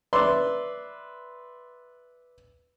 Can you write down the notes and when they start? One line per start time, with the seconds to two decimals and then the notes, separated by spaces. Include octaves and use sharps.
0.13 B4 D5 E5 C6